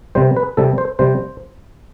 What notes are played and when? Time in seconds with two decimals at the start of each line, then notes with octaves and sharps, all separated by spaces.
0.15 C3 G3 C5
0.37 B4
0.57 C3 G3 A4
0.78 C5
0.99 C3 G3 C5